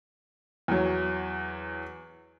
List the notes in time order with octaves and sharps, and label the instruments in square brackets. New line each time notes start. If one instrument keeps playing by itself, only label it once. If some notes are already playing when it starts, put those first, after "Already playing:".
[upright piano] E2 F#3